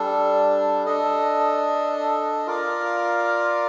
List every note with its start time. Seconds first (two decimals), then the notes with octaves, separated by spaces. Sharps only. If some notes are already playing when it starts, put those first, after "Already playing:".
Already playing: G3 D4 A4
0.86 D4 A4 D#5
2.47 F4 A#4 D5 F5